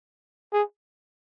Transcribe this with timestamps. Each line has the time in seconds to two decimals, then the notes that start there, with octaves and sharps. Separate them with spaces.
0.53 G#4